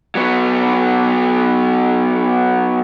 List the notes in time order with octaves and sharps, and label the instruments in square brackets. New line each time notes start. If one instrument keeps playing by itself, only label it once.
[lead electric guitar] F#3 B3